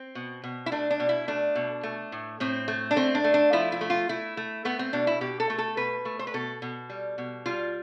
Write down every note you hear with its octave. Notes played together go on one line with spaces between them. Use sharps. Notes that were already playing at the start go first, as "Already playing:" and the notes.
Already playing: C4
B2
B2
E4
A3 D4
D4
B2
E4
A3 D4
B2
A3
A2
A2 C4
A3
D4
A3 C4
D4
A3
D4
F3 E4
E4
A3
F4
A3 E4
A3
A3 B3
C4
B2 D4
E4
B2 G4
A4
A3
A4
B2 B4
A3
C5
B4
B2 A4
B2
G3
B2
G3 F4